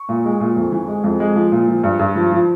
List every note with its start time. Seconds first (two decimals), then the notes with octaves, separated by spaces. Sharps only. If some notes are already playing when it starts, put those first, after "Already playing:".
Already playing: C#6
0.09 A#2
0.25 G#3
0.40 A#2
0.56 F2
0.72 E3
0.88 G#3
1.04 F2
1.20 G#3
1.35 F3
1.52 A#2
1.68 F3
1.84 G2
1.99 G2
2.15 F3
2.32 F3